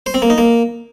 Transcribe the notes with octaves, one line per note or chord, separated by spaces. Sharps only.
C5
C4
A#3
D#4
A#3